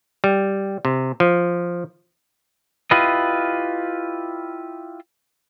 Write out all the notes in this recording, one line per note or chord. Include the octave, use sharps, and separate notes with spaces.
G3
C3
F3
E4 F4 G4 B4 D#5